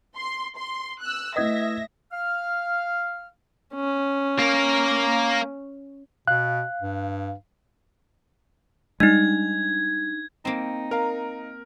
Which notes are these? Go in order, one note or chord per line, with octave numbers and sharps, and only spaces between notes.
C6
C6
E6 F#6
A3 E4 B4 D#5 E5 D#6 G#6 A#6
F5 F6
C#4
A#3 A#4
B2 F5 F#6
G2
G3 G#3 D4 D#4 G#6
A#3 C4 D#4
A#4 F5 A#5